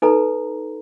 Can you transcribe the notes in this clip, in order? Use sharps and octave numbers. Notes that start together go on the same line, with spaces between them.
D#4 A4 B4 A#5